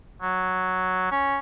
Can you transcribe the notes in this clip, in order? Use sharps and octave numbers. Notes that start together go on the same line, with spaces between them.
F#3
C#4